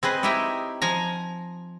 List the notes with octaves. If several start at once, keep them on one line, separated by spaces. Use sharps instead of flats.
C4 G#4 B4 D#5
D#4 E4 G4 D#5 E5 G5
F3 G#5 A#5